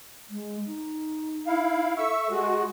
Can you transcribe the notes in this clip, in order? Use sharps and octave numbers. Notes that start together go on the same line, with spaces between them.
G#3
D#4
E4 F5
A4 E5 C#6 E6
G#3 F#4 G4